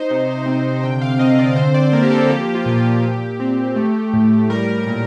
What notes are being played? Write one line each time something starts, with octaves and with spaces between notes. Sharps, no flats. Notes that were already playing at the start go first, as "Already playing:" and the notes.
Already playing: D#4 C5
C3
C4
D3 G5
F5
C4 D#5
D5
D3 C5
D5
A#3 A#4
G4
A4
F3 G4
F4
G4
A#2 F4
G4
A#2 G4
C4
A3
A2
G3 A#4
A#2